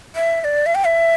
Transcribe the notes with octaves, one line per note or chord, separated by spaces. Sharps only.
E5
E5
D5
E5
G5
E5